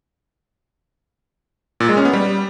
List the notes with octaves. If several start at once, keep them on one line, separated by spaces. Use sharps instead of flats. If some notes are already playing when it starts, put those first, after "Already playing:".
A#2
G#3
C#4
B3
G3